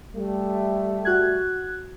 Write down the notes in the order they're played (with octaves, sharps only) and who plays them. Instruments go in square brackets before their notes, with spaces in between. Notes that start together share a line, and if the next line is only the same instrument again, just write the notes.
[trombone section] G3 A3
[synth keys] F#4 F#6 G#6